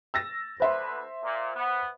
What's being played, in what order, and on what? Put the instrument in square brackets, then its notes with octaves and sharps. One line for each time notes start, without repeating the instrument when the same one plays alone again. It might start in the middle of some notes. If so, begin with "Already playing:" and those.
[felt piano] E6 A6 A#6
[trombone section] D2 D3 B4 [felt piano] C5 E5 C6
[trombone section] A#2
B3